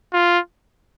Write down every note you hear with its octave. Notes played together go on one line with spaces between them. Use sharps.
F4